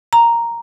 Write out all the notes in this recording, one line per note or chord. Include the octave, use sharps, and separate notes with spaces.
A#5